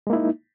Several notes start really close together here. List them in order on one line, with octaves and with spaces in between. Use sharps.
G#3 A#3 E4 D#4